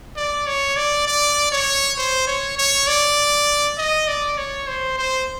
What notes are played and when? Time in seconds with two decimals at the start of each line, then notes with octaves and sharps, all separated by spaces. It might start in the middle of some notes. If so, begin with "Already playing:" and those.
0.17 D5
0.47 C#5
0.77 D5
1.07 D5
1.52 C#5
1.98 C5
2.27 C#5
2.58 C#5
2.87 D5
3.78 D#5
4.08 D5
4.38 C#5
4.68 C5
4.98 C5